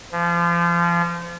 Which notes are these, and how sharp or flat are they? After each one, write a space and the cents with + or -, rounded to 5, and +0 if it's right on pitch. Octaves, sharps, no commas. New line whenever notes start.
F3 -30